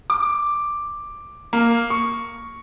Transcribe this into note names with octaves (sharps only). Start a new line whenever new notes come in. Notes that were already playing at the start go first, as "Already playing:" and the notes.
D6
A#3
C#6